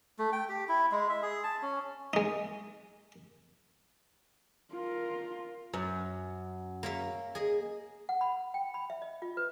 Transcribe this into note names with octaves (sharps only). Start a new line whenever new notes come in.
A3
G5
G4
E4
G#3
E5
G#4
A5
C#4
G#3 D#4
F4 A#4
F#2
A#3 C#5 E5
G#4 D#5
F#5
B5
G5
B5
E5
D#5
F4
B4